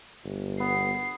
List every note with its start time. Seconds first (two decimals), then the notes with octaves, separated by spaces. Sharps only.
0.25 G1
0.60 B3 C7